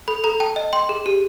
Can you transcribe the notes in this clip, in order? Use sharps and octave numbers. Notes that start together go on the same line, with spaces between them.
A4 B5
A4 A#5
G5 A5
D#5
G5 C6
G#4
G4